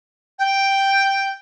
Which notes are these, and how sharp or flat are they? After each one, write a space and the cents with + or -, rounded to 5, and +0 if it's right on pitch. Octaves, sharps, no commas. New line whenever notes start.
G5 +0